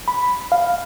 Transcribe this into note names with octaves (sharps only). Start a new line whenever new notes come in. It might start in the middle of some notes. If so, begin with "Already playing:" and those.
B5
F5